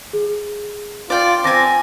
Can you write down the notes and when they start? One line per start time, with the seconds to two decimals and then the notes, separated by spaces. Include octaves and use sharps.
0.13 G#4
1.10 F4 D5 G5
1.44 C4 G#5 A5 D6 A#6